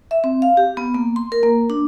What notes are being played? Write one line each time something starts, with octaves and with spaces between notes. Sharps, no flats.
E5
C4
F5
G4
B3
A#3
C6
A#4
A#3
D4